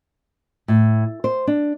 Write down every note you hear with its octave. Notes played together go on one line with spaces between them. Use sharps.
A2
C5
D4